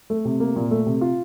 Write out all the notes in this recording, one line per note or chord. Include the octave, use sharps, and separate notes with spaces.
A3
C3
A#3
A#2
A3
C3
F4